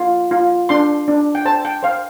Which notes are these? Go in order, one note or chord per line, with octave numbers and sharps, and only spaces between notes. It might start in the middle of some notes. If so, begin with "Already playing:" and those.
Already playing: F4
F4
D4 C6
D4
G5
C5 A5
G5
C5 F5